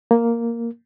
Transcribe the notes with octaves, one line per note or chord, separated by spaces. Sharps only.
A#3